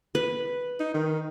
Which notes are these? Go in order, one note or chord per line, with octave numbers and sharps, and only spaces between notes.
B4
D#4
D#3